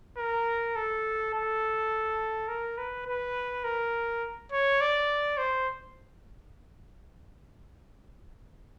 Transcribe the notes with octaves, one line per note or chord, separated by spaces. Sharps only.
A#4
A4
A4
A#4
B4
B4
A#4
C#5
D5
C5